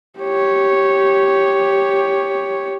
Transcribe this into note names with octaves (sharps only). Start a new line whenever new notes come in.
G4 C#5